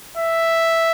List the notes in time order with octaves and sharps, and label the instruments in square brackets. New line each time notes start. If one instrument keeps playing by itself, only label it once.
[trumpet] E5